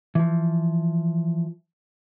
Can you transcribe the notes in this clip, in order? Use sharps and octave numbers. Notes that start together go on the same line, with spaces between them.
E3 F3